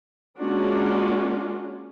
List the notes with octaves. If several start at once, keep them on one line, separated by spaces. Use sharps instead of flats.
G#3 A#3 C#4 D4 F4 F#4